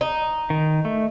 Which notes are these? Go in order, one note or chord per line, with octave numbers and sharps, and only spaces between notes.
D#4
D#3
A3